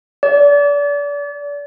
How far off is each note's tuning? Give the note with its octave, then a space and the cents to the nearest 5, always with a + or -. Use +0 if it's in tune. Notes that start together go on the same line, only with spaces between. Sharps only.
D5 -35